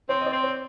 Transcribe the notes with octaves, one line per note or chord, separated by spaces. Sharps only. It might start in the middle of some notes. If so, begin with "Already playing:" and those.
C4 C#5
D#5
D5
C4
C#5